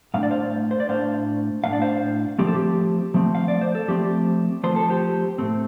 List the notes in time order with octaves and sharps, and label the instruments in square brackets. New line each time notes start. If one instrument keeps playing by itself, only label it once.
[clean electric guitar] A2 A3 D4 F5
D5
C5 F5
C5
D5
A2 A3 D4 C5 F5
A3 D4 F5
A2 D5
C5 F5
F3 A3 C4 G4
A4
G4
F3 A3 C4
F5
D5
C5
A4
F3 A3 C4 G4
F3 A3 C4 C5
A4
G4 C5
A2 A3 C4